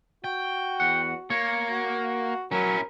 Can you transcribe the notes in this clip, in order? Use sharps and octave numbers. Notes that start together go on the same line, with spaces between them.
F#4 G5
E2 F#5
A#3 C#5
F#4
F#3 C#4 E4 A#4